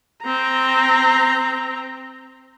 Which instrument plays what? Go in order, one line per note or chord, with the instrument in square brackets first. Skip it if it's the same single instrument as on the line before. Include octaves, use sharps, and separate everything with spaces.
[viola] C4 A#5